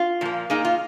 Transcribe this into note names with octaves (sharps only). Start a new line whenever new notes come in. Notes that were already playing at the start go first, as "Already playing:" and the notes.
Already playing: F4
A#2 F3 A#3
A#2 A#3 D#4 G#4
F4